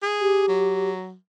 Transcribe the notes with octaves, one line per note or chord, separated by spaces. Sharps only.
G#4
G4
F#3